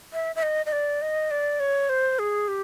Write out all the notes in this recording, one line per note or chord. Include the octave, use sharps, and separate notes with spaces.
E5
E5
D#5
D#5
D5
D#5
D5
C#5
C5
G#4
G4